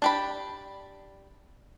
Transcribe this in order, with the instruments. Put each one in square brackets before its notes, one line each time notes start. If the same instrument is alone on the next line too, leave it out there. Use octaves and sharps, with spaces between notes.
[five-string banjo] D4 G4 B5